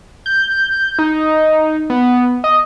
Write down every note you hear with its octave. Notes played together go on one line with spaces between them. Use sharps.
G6
D#4
B3
D#5